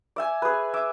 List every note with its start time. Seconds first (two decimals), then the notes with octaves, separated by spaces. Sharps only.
0.16 D5 E5 G#5
0.42 G#4 B4
0.74 E5 D6